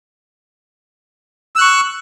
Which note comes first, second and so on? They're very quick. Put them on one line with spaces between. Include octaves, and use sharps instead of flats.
E6 F#6 C#6